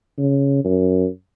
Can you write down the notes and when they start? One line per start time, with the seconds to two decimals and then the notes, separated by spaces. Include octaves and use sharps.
0.18 C#3
0.64 F#2